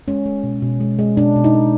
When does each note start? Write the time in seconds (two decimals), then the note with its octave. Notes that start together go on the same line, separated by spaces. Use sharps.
0.08 G#3 C#4
0.26 G#3
0.43 B2
0.62 B2
0.81 G#3
0.99 G#3
1.17 B2 D4
1.36 B2
1.44 D#4
1.54 G#3